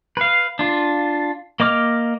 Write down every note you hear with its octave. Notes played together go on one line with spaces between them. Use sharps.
B4 F5
D4 F4
A#3 D#5 D6 F6